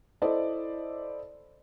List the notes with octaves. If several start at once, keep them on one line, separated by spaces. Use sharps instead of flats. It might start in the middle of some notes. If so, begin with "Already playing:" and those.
E4 A4 C5 D5 D#5